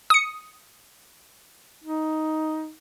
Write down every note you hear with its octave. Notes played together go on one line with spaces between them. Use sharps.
D#6 C#7
D#4